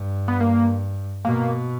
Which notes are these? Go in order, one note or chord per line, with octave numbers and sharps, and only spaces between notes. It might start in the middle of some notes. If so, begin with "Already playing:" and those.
Already playing: G2
B3
A#3
B2 A#3